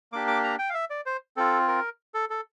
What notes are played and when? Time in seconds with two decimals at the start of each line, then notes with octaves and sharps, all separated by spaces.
0.12 A#3 D4 G4 D6
0.27 D6
0.44 A#5
0.59 G5
0.70 F5
0.74 E5
0.90 D5
1.06 C5
1.37 C4 F4 A4
1.68 A#4
2.14 A4
2.30 A4